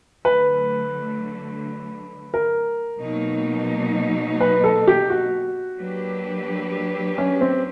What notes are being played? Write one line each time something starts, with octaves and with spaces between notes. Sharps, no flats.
D3 F#3 A3 B4
A#4
B2 F#3 A#3 D#4
B4
A4
G4
F#4
F#3 A#3 D4 G4 B4
C#4
C4